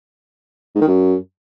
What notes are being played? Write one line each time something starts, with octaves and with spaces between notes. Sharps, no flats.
G#2
D#3
F#2